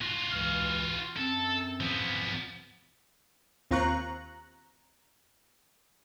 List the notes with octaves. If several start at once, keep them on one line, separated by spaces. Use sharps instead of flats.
F4 F#4
C#2 E3 F6
F#2 C4 A4
F3 B3
D#2 C4 F4 A#5 C#6 F#6